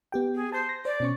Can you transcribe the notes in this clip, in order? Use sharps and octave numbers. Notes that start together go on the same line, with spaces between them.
B3 G4 G5
G#4
C5 A5 G6
A#6
C5 D5
B2 C#4 C#6